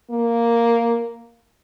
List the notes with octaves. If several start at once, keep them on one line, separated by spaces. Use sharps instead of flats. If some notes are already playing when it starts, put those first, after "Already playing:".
A#3